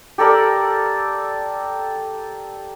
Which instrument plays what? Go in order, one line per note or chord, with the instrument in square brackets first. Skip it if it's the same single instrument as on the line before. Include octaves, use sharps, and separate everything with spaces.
[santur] G4 A4 A#4 D5